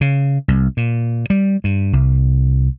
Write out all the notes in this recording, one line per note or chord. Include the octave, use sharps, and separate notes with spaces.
C#3
C2
A#2
G3
G2
C2